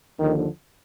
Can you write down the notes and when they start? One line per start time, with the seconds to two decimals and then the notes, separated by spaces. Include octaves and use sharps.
0.19 D#2 D3 D#3 F3